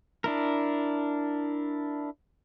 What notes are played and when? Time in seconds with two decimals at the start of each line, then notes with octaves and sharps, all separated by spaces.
0.24 D4 E4 A#4